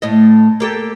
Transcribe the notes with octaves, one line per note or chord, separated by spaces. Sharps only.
A2 A3 D#5
A#3 G4 A4